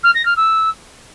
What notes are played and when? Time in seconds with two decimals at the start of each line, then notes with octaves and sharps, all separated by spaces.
0.03 F6
0.14 A#6
0.25 F6
0.36 E6